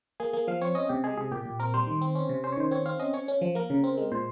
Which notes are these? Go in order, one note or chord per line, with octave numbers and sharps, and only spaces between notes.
A#3 G#4
A#3 G#4
F3 F5
C4 C#5
C#4 D#5
C3 G4
G#3 G#4
C3 G#4
A#2 G4
A#2
C4 A#4
G3 C5
D#3
C4
C#4
C3
C#4 C5
C#5
D#3 C5
C4 C#5
C4 F5
C#4 D#5
C#4 C#5
C#4
F3
A#3 A#4
C#3
C4
G#3
A#2 C5